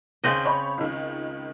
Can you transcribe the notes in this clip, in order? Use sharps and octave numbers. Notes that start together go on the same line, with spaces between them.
D#2 C#3 C4 D#5 G6 F#7
C#5 B5
C#2 D#3